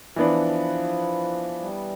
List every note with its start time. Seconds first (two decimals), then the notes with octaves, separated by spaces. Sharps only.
0.16 E3 F3 B3 D4
1.60 G3